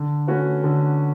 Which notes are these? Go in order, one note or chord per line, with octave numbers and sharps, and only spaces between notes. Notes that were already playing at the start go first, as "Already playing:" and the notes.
Already playing: D3
A3 C#4 F#4 B4
D3